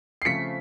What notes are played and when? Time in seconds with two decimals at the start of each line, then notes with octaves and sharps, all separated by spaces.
0.22 C7
0.25 C#3 F3 A3 C4 B6 C#7